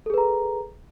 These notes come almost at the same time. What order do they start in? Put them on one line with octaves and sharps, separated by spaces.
A4 G#4 B4 A#5